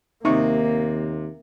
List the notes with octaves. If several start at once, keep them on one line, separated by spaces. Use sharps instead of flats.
D#2 C3 A#3 D#4 C#6